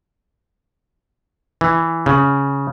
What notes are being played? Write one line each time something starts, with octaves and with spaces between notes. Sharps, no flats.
E3
C#3